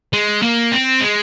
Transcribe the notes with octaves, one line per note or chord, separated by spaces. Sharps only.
G#3
A#3
C4
G#3